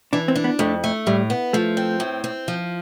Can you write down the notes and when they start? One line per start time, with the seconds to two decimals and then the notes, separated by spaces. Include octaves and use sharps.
0.13 E3 D4
0.28 C4
0.36 D4
0.44 B3
0.59 F2 A3
0.84 A3
1.07 A2 G3
1.30 B3
1.53 F3 A3
1.77 C4
2.00 A2
2.24 C4
2.48 F3